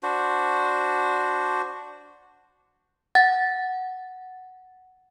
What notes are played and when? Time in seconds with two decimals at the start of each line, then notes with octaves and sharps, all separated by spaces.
0.03 D4 F#4 C5
3.15 F#5 A6